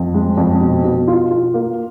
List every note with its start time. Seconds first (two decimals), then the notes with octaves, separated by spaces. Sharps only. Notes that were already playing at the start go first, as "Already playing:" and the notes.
Already playing: F2
0.14 G#3
0.37 F2
0.61 B2
0.84 B2
1.08 F4
1.31 F4
1.54 A#3